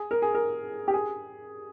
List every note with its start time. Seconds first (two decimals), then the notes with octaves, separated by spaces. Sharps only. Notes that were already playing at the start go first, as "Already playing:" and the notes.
Already playing: G#4
0.11 A#4
0.22 G#4
0.35 A#4
0.88 G4
0.94 G#4